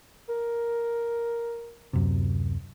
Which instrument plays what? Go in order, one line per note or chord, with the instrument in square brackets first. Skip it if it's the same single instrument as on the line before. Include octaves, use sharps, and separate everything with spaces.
[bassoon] A#4
[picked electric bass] D1 F#2 C3